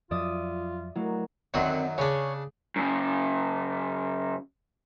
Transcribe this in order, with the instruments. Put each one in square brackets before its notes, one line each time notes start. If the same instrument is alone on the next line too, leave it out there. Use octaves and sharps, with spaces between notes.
[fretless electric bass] F2 F3 F#3 [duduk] F4 [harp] D5 E5 D#6
[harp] F#3 A#3 [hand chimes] A3 E4 [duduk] F#4
[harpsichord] F#2 D#3 F#3 [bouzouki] D3 C4 F#5
[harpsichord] C#3 D4 [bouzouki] C#4 G#4 C#5
[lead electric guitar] F#2 C#3